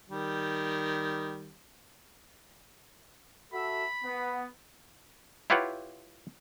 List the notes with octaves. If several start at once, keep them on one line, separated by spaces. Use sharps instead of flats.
D#3 G3
F#4 A4 E5 B5
B3
E4 F4 G4 B4 C#5 F#5